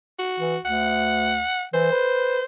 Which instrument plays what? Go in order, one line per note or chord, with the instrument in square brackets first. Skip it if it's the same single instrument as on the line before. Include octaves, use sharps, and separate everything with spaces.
[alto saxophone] F#4
[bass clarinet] E3
[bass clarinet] D2 [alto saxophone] F#5
[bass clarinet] E3 [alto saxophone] C5
[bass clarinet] B4